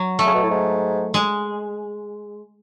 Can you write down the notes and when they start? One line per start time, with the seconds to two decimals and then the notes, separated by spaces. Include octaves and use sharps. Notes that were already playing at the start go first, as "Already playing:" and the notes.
Already playing: F#3
0.19 A3
0.26 C#3
0.34 B2
0.43 A2
0.50 G#2
1.14 G#3